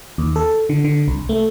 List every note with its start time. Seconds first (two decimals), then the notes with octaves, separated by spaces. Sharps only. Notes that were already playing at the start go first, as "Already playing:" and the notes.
0.18 D#2
0.36 A4
0.69 D3
0.84 D3
1.08 C2
1.29 A3